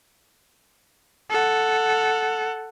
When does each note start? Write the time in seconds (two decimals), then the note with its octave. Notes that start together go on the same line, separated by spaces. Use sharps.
1.30 A4 F#5